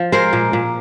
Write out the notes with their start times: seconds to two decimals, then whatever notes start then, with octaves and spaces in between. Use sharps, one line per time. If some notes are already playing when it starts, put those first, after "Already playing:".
Already playing: F3
0.12 G#3 A#4 C5
0.33 A#2
0.53 A#2